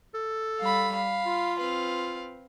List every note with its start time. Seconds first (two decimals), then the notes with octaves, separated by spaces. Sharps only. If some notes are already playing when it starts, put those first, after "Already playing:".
0.14 A4
0.59 G3 F5 B5
0.93 F5 B5
1.26 F4
1.60 C4 B4 F5